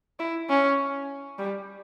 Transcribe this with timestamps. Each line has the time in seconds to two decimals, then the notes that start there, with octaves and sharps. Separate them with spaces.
0.19 E4
0.49 C#4
1.39 G3